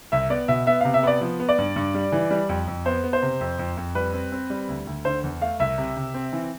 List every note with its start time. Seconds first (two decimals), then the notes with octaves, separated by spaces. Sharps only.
0.12 C2 E5
0.30 B3 D5
0.48 B2 E5
0.67 B3 E5
0.81 C3 F5
0.94 E5
1.03 B3 D5
1.21 F3
1.40 B3
1.49 D5
1.58 G2
1.76 G2
1.94 G3
2.12 E3
2.31 G3
2.49 F2
2.67 F2
2.85 B3 C5
3.04 B3
3.13 C5
3.22 C3
3.41 F2
3.59 F2
3.77 F2
3.95 G3 B4
4.13 C4
4.32 C4
4.50 G3
4.68 D2
4.87 D2
5.05 D3 C5
5.24 E2
5.41 A3 F5
5.60 C2 E5
5.78 C3
5.97 C3
6.14 C4
6.33 E3